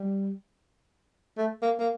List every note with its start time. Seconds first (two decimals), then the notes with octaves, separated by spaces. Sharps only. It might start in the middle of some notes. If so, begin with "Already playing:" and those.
Already playing: G3
1.37 A3
1.62 A#3
1.79 A#3